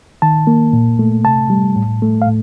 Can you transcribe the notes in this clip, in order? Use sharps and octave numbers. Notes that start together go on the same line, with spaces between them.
D#3 A5
A#3
A#2
A3
C3 A5
G3
A2
A3
F5
A2